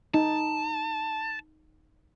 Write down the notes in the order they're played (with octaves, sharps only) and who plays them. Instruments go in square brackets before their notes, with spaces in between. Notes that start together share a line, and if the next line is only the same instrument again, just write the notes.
[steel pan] D#4 [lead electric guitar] A5